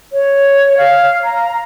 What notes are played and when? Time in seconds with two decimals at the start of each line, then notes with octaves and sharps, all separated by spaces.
0.13 C#5
0.78 F5
1.24 A#5